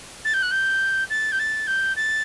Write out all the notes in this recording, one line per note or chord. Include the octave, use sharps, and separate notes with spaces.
A6
G6
F#6
G6
A6
G6
A6
G6
A6